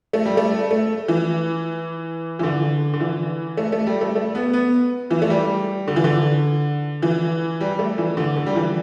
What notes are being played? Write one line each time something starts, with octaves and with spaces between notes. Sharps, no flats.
A3
G3
A3
A3
E3
E3
D3
D3
E3
A3
A3
G3
A3
A3
B3
B3
E3
A3
G3
D3
E3
D3
E3
G3
A3
E3
D3
D3
G3
E3